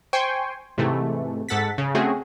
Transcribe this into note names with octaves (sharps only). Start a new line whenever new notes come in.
C5 G5 G#5 C6 C#6
G#2 C3 E3 A3
G#2 A4 F#5 A6 B6
C#3
A3 C4 C#4 F#4 G#4